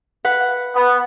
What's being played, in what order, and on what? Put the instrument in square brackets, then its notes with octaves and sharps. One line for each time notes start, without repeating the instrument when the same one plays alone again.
[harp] B4 F#5
[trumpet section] B3